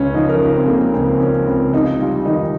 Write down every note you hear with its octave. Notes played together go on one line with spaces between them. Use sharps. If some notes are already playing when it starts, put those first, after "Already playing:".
Already playing: C#2 C#3 C#4
F3 D#4
A#4
C#2 C#4
C4
C#3 A#3
C#2 C4
F3 C#4
C#2 C4
C3 D#4
G3 F4
D#3 D#4